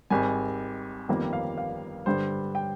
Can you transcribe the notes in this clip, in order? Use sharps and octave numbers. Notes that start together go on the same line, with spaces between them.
G#1 G#2 G3 G#5
G1 F2 D#3 G3 A#3
F5
F5
G2 D3 G3 C5
G5